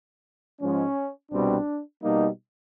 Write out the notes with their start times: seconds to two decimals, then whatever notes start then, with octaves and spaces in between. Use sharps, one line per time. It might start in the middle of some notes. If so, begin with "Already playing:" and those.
0.61 G#2 F3 G#3 C#4
1.32 C2 B2 G3 C4 D4
2.02 B2 G3 A#3 D#4